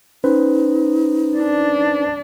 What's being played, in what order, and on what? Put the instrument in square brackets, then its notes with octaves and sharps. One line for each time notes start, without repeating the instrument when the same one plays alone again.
[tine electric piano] C#4 B4 C5 [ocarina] D#4
[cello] D4